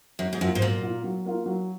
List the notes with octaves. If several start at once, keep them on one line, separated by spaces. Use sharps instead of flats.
F#2 F#3
G#2
F#2 A#3 F4
G#2
A#2 F#3
A#3 F4
F#3
A#3 F4
F#3